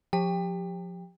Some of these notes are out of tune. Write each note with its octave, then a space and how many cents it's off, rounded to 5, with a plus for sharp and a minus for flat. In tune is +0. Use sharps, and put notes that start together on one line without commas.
F3 +30 G4 +15 G5 +25